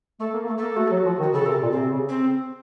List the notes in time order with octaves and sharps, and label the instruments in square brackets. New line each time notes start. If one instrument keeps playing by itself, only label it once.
[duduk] A3 [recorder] A4
[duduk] A#3
A#3
A3
[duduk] A#3 [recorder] A4
[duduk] A3 [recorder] F#4
[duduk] F#3 [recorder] A4
[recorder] F#4
[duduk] F3
D#3
[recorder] F#4
[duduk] C#3 [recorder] A4
[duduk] C3 [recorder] A#4
[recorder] A4
[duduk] A#2
[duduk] C3 [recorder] C4
[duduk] C#3
[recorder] C4